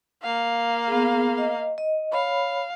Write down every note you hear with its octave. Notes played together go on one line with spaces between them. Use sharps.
A#3 F5
B3 G#4
D#5
D#5
C#5 F5 B5